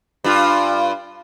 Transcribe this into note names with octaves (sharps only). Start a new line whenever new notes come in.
G2 F4